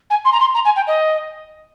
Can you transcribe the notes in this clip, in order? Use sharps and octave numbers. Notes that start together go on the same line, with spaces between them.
G#5
C6
A#5
C6
A#5
G#5
G5
D#5